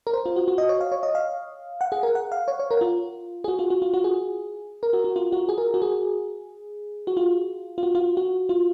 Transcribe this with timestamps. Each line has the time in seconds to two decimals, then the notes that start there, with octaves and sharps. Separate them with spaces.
0.07 A#4
0.14 C5
0.26 F4
0.36 F#4
0.48 F#4
0.58 D#5
0.69 C#5
0.81 F5
0.92 C#5
1.03 D#5
1.15 F5
1.81 F#5
1.92 G#4
2.03 A#4
2.15 F#5
2.32 F5
2.48 C#5
2.60 C#5
2.71 A#4
2.81 F4
3.44 G#4
3.48 F#4
3.59 F4
3.70 F#4
3.82 F4
3.94 F#4
4.04 G#4
4.83 A#4
4.93 F#4
5.04 F#4
5.16 F4
5.32 F#4
5.49 G#4
5.58 A#4
5.74 F#4
5.82 G#4
7.07 F#4
7.17 F4
7.78 F4
7.83 F#4
7.95 F4
8.17 F#4
8.49 F4